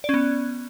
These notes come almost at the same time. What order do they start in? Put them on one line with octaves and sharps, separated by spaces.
D5 C#4 B3